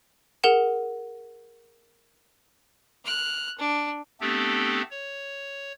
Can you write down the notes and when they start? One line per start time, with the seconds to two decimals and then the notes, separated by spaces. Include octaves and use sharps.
0.43 G#4 A#4 F#5 E7
3.04 F6 F#6
3.58 D4
4.21 A3 B3 C4 D4 G4 A4
4.91 C#5